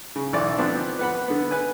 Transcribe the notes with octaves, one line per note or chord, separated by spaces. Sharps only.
C#3
B1 E3 A4 D5
D3 F3 B3 C4 D4
B4 F#5 B5
D3 B3
B4 G#5